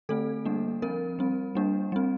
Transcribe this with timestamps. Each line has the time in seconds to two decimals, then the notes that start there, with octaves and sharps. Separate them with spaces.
0.09 D3 A3 C4 A4
0.45 G3 A#3 D4
0.82 F3 C4 A#4
1.19 G3 C4
1.55 G3 A#3 D4
1.92 G3 C4